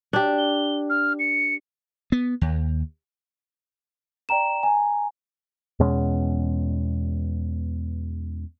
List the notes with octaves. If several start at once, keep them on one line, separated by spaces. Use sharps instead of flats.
D4 G4
G7
F6
C#7
B3
D#2
D5 G5 A#5 E7
G#5 A#5
E2 B2 G#3 C#4